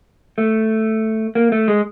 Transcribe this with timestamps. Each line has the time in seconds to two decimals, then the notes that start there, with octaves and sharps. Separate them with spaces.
0.38 A3
1.35 A#3
1.52 A3
1.68 G#3